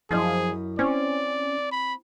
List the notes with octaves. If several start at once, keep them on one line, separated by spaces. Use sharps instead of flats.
F#2 F3 E4 G#4 D#5
C4 C#4 D5
B5